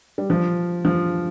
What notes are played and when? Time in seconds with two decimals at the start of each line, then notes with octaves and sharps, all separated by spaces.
0.18 G3
0.30 F3
0.85 F3